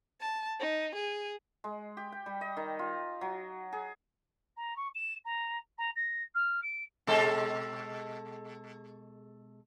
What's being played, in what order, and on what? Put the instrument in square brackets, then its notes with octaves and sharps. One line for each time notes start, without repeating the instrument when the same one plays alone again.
[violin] A5
D#4
G#4
[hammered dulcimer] G#3
G4
G5
G3
D#5
D#3
F4
F#3
G#4
[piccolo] A#5
C#6
E7
A#5
A#5
A#6
F6
D7
[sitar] B2 G#3 A4